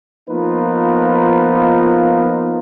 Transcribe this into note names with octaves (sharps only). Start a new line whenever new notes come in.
F3 A#3 B3 D#4 F4 B4